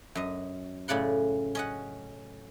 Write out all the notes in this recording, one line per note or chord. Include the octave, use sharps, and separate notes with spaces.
F#2 D#5
A2 C#3 D5 F#5 C6
C#4 D#5 F#5